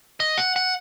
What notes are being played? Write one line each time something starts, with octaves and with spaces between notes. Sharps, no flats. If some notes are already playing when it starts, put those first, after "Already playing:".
D#5
F#5
F#5